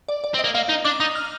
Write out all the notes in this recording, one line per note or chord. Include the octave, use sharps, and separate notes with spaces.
D5
D5
C4
D#5
A#3
A#3 F5
D#4
D4 D6
D#4 D#6
F6